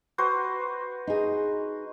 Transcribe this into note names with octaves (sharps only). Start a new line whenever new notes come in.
F#4 B4 C5
D#4 G#4